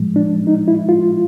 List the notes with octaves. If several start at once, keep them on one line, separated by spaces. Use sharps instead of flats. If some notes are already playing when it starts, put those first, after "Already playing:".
Already playing: A2 F3 G#3
D4
D#4
E4
F4